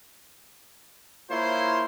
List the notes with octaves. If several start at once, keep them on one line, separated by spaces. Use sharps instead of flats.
A#3 E4 F4 C5 C#5 C6